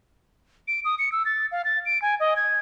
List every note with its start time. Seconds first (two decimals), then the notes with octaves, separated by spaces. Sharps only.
0.68 D7
0.85 D#6
0.99 C#7
1.12 E6
1.25 A6
1.52 F5
1.65 A6
1.86 D7
2.02 G#5
2.20 D#5
2.36 G#6